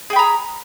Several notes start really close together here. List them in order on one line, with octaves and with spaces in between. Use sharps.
G#4 G5 B5 A#5